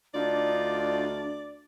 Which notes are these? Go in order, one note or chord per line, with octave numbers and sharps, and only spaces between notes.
D2 D4 D#4 F4 D5